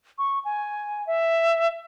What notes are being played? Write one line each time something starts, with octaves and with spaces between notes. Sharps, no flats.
C#6
G#5
E5